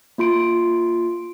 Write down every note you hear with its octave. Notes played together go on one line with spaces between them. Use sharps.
A#3 F4 C6 D7